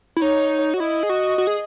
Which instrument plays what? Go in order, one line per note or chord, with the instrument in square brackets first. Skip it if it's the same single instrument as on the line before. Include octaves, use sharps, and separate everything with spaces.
[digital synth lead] E4
[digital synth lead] D#4 [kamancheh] C#5
[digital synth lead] F#4
[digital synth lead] E4 [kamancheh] D#5
[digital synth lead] G#4
F#4
F#4
G#4